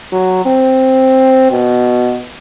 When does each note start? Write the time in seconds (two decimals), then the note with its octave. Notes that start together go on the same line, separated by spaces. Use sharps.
0.12 F#3
0.45 C4
1.51 B2